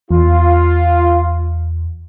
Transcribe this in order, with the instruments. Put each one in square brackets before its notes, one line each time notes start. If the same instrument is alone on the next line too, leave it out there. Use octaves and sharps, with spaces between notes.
[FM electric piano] E2 [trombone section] F4